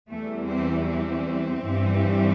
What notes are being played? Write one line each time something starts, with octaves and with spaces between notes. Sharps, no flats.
E2 E3 G3 A3
C4
C4
G2 E3 G3